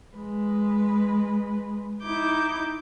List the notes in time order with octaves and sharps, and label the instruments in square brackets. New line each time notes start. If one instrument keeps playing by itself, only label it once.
[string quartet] G#3 B4
D#4 E4 D6 G6